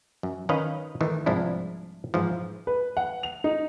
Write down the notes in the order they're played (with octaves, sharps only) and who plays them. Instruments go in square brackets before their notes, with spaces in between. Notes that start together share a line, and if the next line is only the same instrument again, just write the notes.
[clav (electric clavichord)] F#2
D#3 C#4 B4 D#5 F5
D#3 E3 A3
C2 G#2 F3 D4 E4
G#2 E3 F3
[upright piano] B4
F#5
F7
D#4